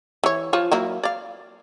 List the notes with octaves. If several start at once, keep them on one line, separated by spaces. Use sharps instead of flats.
E3 C#5
F3 F4 C#5
F#3 A#3 E4
D5 F5